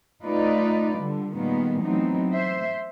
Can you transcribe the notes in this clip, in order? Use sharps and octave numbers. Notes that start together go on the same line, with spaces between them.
A3 D#4 F4 B4 D5
D3 G3
A#2 D#3 G3 G#3 A#3 B3
E3 F#3 A3 B3 C4 D#4
C5 E5